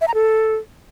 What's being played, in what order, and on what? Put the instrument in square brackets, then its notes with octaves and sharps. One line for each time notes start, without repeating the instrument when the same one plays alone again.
[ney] E5
A#5
A4